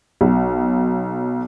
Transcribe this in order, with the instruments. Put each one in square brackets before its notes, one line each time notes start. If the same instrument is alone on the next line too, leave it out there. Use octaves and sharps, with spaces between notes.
[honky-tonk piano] B1